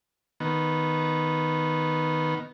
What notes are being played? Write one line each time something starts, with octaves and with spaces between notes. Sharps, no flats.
D#3 B3